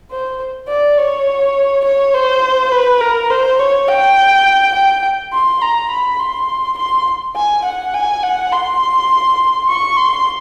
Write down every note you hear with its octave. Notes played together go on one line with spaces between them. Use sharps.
C5
D5
C#5
C#5
C5
B4
A#4
C5
C#5
G5
G5
C6
A#5
B5
C6
C6
G#5
F#5
G#5
F#5
C6
C#6
C6